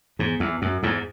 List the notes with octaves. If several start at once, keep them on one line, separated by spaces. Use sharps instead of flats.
E2 G#2
E2
F#2
E2 G#2